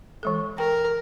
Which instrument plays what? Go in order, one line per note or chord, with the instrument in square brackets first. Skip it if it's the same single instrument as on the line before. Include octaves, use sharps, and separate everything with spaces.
[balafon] E3 G#3 A4
[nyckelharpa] A#4 [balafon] G5